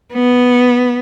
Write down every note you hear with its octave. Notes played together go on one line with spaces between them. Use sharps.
B3